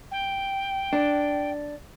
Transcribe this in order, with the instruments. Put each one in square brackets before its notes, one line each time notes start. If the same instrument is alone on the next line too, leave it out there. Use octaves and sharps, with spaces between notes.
[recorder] G5
[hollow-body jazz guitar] D4